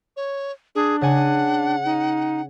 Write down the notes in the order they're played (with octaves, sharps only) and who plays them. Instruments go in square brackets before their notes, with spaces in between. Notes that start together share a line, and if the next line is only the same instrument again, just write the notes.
[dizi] C#5
[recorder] D4 [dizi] G#4
[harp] C#3 G#5 [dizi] F#5
[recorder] D#4